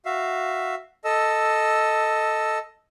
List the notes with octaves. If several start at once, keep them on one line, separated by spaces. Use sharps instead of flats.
F#4 E5 F5
A4 D#5 E6